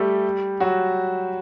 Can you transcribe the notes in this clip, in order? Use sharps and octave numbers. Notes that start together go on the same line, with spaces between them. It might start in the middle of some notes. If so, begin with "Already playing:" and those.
Already playing: G3 A3 G4 A4
F#3 F#4